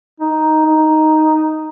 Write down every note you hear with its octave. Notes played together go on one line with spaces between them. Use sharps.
D#4
D#4